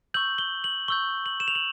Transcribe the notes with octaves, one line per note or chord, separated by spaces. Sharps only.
C#6 E6 G6 F#7
G7
F#7
C#6 E6 G6 G7
F#7
E7
F7
F#7